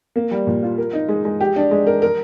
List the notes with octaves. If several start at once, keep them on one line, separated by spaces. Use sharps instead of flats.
A#3
G3
A#2
F4
A#4
D#4
G#3
G#3
G4
D4
G#3
A#4
A#4